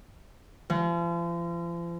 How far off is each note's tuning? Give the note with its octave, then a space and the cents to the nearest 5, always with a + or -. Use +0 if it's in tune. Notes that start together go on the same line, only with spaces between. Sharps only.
F3 -40